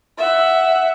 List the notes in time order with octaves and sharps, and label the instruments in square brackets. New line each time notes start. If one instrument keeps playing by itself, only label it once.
[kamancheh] E5 F#5